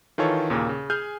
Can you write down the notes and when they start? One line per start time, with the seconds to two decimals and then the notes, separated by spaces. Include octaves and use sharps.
0.18 D#3 E3 F4 A4 C#5
0.50 D#2 A#2 C#3 A#3
0.69 C#3
0.90 G#4 G#5 F6 G6